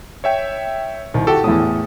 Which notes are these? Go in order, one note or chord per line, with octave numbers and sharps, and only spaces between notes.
C#5 E5 G5
C2 D#3
F#4 G4 A4
E2 A2 D#6